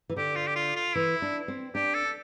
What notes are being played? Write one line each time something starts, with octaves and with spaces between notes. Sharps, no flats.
E3
D3 G4
F4
G4
F4
F4
E3 E4
D4
C4
D4 G4
A4